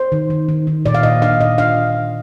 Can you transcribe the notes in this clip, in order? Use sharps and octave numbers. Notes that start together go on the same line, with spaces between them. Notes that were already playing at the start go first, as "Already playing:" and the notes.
Already playing: C5
D#3
D#3
D#3
D#3
A#2 D5
F5
A#2 D#5
D4 F5
A#2 D#5
D4 F5